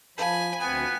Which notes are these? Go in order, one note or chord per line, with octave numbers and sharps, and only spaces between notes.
F3 F5 G#5 A5 B5 G6
D2 B3 C4 G#5